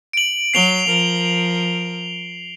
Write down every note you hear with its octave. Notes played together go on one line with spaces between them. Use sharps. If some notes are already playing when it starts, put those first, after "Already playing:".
D7 F#7
F#3 C7 F7 G7
F3 A#4